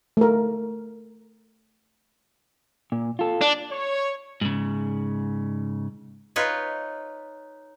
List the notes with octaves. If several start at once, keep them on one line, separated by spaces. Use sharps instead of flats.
A3 A#4
A#2
F4 A4
D4
C#5
G#2 C#3
D#4 F4 B4 C#5